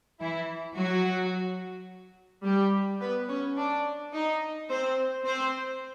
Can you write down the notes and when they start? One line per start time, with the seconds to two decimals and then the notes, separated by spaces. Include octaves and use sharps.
0.20 E3 E4
0.76 F#3 F#4
2.44 G3 G4
3.01 B3 B4
3.29 C#4 C#5
3.57 D4 D5
4.13 D#4 D#5
4.70 C4 C5
5.25 C4 C5